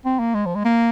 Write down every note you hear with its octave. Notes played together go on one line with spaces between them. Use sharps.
C4
A#3
G#3
F3
G#3
A#3